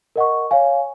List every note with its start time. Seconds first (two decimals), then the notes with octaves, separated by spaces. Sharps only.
0.16 A#4 D#5 F#5 C#6
0.51 C#5 F5 G#5